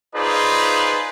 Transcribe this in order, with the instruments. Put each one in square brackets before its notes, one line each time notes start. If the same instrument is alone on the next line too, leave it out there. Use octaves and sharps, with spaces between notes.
[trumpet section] D#4 F4 G#4 B4 C5 D5